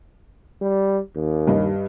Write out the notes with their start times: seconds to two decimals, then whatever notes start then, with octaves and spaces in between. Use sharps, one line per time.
0.62 G3
1.16 D#2
1.47 G2 G3 D#5